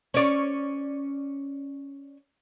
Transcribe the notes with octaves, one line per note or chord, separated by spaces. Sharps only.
C#4 D5